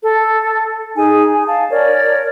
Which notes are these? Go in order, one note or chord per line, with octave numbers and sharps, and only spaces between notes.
A4
D#4 G#4 G#5
G#5
F5 A5
A#4 C#5 D5